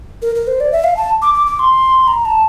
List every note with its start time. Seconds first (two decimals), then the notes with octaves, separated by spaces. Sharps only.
0.22 A#4
0.35 A#4
0.47 C5
0.60 D5
0.72 E5
0.84 F5
0.97 A5
1.22 D6
1.34 D6
1.47 D6
1.59 C6
2.08 A#5
2.25 A5